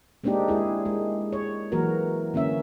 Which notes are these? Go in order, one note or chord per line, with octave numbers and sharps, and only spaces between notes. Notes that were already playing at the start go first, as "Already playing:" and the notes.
G#3 A#3 C4 D4 D#4 G4
G#3 E4 G#4
G#3
C#5
E3 F#3 A#3 F#4 A#4
D3 A#3 C#4 E5